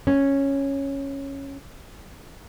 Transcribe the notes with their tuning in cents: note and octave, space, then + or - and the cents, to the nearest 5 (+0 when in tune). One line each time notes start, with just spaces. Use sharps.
C#4 -5